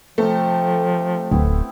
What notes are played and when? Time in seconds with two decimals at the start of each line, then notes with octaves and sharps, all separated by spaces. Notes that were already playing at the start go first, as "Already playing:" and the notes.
0.18 C3 F3 A3 F5
1.32 D1 B3 C4 E4